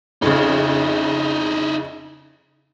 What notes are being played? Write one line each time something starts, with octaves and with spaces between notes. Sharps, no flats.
F2 C#3 D#4 E4